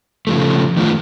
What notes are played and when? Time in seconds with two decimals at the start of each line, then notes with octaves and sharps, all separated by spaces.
0.27 C#3 F3 A3
0.77 D#3 A3 F4